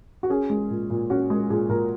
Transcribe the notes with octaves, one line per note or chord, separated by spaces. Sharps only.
F#4
C#4 G#4
G#3
A#2
A#2
C#4 F#4
G#3 G#4
A#2 G#4
A#2 A#4